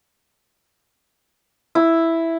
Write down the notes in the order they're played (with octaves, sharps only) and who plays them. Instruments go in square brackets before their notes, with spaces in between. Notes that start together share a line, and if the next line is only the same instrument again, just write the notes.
[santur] E4